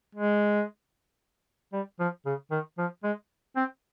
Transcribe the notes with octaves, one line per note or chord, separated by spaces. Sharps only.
G#3
G3
F3
C#3
D#3
F3
G#3
C4